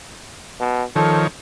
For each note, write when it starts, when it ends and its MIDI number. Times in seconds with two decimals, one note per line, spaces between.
0.60 0.84 47
0.96 1.27 51
0.96 1.27 53
0.96 1.23 69
0.96 1.27 73